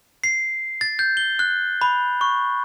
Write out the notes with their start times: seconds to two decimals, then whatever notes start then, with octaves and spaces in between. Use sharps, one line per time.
0.24 C7
0.81 A6
0.99 G6
1.17 G7
1.39 F#6
1.81 B5
2.21 C#6